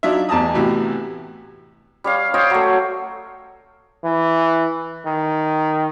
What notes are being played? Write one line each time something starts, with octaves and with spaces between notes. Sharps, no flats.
F#3 D4 D#4 F4 E5
A1 E2 A5 A#5 D#6
A2 C3 E3 B3 F#4 G4
G3 C#5 F5
C5 C#5 D#5 G5
F#3 A3
E3
D#3